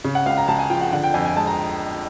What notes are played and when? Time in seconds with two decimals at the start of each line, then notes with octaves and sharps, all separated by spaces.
0.04 C#3
0.15 F#5
0.26 C#2 F5
0.37 A#5
0.48 C#2 A5
0.59 G#5
0.70 F3 G5
0.81 F#5
0.92 D3 F#5
1.03 G5
1.14 F2 G#5
1.25 G#5
1.36 G#3 A5
1.47 A#5